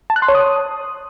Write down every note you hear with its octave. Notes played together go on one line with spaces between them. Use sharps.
A5
F#6
C6
C#5
D#6